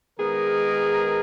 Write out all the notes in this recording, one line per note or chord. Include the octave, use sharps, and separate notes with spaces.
D#3 G#3 B3 G#4 A#4